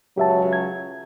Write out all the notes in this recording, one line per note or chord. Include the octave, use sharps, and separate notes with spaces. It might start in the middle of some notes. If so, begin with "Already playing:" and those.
C#2 C#3 F#3 G4 E5 A5
G#6